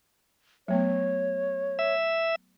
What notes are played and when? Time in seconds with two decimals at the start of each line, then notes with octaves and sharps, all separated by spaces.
0.68 F#3 A3 B3 C#5
1.79 E5